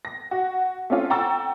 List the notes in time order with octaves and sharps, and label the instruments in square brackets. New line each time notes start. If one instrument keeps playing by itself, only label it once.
[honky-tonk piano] A#6
F#4
A3 C4 C#4 F4
F#5 G5 A#5 C#6 E6 A6